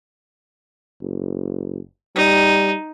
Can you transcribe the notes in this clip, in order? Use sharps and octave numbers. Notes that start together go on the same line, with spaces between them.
F#1
G3 D#4